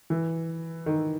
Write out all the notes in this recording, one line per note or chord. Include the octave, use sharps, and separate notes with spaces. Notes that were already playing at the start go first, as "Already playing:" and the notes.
E3
D#3